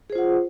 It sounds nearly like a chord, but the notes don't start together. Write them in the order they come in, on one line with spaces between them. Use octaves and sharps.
G#4 C5 F4 F#5